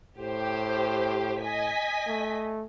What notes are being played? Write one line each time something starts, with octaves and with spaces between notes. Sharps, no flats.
A2 G4 C5
D#5 G#5 B6
A3